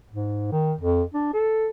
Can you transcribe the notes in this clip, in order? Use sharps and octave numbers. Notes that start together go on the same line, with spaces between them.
G#2
D#3
F2
D4
A4